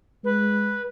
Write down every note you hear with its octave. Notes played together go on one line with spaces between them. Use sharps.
G#3 B4